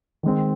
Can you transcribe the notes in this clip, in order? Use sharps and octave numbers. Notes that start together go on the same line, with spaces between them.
D#3 G#3 C4